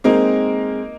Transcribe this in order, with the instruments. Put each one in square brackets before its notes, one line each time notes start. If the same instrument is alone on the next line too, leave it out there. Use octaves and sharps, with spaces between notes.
[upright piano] G#3 C4 [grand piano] A#3 D#4 A#4